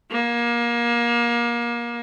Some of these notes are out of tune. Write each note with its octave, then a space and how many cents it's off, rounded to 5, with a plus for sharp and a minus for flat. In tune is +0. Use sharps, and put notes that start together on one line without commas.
A#3 +25